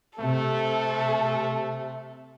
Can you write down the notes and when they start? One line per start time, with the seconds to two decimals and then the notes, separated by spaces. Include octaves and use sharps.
0.19 C3 A3 A4